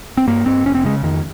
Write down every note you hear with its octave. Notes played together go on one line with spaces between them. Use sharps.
C4
G2 A#3
G2 C4
F1 C#4
C4
C#3 G#3
F2 D#3